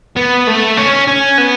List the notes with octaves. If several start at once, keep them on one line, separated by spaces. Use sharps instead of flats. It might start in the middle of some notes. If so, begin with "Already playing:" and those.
B3
A3
C#4
C#4
B3